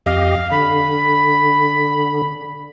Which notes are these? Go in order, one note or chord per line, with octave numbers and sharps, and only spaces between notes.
F2 G4 D#5 F5
D3 B5